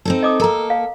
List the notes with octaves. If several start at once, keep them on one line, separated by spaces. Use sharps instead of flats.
C4 D#4 A4
D#5 D6 D#6
A#3 A4 A#4 A#5
F5